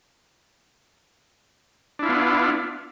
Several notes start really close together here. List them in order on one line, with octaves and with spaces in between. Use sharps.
D4 E4 F4 B3